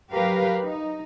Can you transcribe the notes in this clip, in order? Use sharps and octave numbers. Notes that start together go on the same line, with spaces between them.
F#3 G4 A#4 B4 F5
D#4